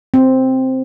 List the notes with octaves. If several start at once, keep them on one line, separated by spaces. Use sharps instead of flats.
C4